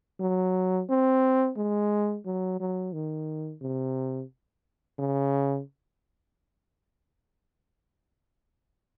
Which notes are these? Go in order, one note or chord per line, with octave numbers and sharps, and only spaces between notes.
F#3
C4
G#3
F#3
F#3
D#3
C3
C#3